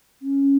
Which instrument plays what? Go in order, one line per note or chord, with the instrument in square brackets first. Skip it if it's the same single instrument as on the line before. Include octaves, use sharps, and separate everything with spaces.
[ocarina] C#4